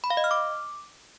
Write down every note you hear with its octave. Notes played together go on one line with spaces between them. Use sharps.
B5
F5
D#5
F6
D6